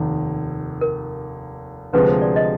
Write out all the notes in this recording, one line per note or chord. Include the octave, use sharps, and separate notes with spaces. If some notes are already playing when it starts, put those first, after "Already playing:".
Already playing: F1 D#2 D#3
A#4
D2 C3 F3 G#3 B4
C5
D5
D#5